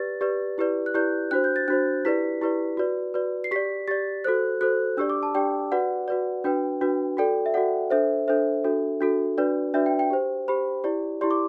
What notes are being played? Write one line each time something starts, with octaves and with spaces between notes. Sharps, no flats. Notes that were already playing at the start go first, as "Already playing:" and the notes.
Already playing: G4 B4 D5 A6
G4 B4 D5
E4 G4 B4 D5
F#6
E4 G4 B4 D5 G6
D4 F#4 C5 F#6
G6
A6
D4 F#4 C5 F#6
E4 G4 B4 D5 B6
E4 G4 B4 D5
F#4 B4 D5
F#4 B4 D5
C7
G4 D5 B6
G4 D5 A6
F#4 A4 C5 F#6
F#4 A4 C5 F#6
D4 G4 D5 E6
D6
A5
D4 G4 D5 G5
F#4 B4 D5 F#5
F#4 B4 D5
D4 F#4 B4 G5
D4 F#4 B4
F#4 A4 D5 G5
E5
F#4 A4 D5 F#5
D4 A4 C5 E5
D4 A4 C5 E5
D4 F#4 A4
D4 F#4 A4
D4 F#4 B4 D5
D4 F#4 B4 D5 E5
G5
G5
G4 C5
G4 C5 B5
E4 G4 D5
E4 G4 D5 C6
D6